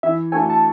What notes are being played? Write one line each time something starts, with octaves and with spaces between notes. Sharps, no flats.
E3 E5
A3 D4 F#4 A4 G#5
A5